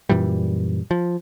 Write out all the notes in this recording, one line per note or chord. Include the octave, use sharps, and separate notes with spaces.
F#2 A#2 E3 G3
F3